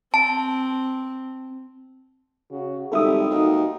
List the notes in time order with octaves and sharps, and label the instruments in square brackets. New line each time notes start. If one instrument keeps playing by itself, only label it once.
[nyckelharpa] C4 [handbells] A5
[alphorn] C#3 [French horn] F#4
[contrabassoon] G#1 [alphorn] G3 [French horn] G4 [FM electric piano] A4 E5 D#6
[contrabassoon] D#2 [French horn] D#4 [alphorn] F#4